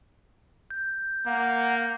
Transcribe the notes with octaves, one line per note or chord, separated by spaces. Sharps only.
G6
A#3 F#5